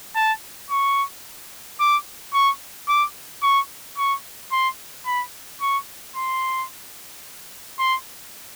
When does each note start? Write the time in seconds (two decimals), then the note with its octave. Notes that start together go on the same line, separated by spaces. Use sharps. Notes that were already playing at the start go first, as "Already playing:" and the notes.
0.15 A5
0.71 C#6
1.80 D6
2.34 C#6
2.88 D6
3.43 C#6
3.98 C#6
4.52 C6
5.06 B5
5.61 C#6
6.16 C6
7.79 C6